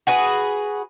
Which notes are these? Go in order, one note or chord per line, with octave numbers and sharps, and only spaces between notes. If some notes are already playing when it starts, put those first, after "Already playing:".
F#4 G#4 B4